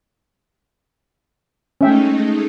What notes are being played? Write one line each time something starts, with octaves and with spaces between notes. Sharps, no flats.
G#3 A3 C#4 D#4 E5 G5